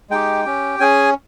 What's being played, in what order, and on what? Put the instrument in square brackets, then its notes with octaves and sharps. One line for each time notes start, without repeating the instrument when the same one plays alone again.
[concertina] G#3 D#4 G4 G5
C#4 G4
C#4 G#4 G#5